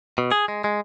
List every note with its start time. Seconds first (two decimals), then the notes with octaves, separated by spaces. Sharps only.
0.18 B2
0.31 G#4
0.48 G#3
0.64 G#3